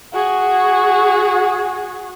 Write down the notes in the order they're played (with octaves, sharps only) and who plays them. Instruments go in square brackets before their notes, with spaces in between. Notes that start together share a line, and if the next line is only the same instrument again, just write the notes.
[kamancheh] F#4 G#4